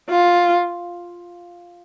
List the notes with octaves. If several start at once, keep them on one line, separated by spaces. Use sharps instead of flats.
F4